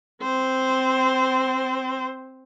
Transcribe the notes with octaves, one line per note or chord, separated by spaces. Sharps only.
C4 C5